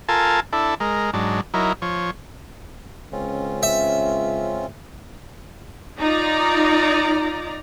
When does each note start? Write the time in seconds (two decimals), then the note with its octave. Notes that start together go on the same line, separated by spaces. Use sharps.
0.09 F4 A4 A#4 G#5 A5
0.53 D4 E4 A4
0.80 G#3 A#4
1.13 G#2 F#3 D4
1.54 F#3 D#4 E4 A#4
1.82 F3 C#5
3.12 C#2 C4 C#4 F4
3.63 E5
5.99 D#4 F4 D5 A#5